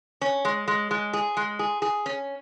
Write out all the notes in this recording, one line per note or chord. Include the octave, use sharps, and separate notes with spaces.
C#4
G#3
G#3
G#3
G#4
G#3
G#4
G#4
C#4